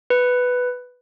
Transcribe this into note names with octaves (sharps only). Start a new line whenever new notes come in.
B4